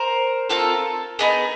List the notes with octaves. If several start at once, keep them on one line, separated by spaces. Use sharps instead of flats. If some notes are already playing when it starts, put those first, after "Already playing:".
Already playing: A#4 C5
C4 F4 A4
B3 D#4 G#4